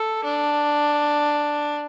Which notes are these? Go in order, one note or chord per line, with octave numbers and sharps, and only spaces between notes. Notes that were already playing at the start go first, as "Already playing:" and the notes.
Already playing: A4
D4